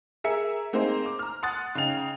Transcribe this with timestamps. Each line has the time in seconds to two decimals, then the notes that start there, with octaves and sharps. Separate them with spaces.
0.24 G#4 A#4 E5 C#7
0.73 A#3 C4 D#4 G#4 C5
1.06 D6
1.19 A#5 F6
1.43 F#5 C6 D#6 F#6 A6
1.75 C#3 D#4 G5 F7